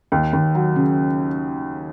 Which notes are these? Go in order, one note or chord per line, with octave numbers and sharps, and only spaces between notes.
D#2
D#2
F#3
C#3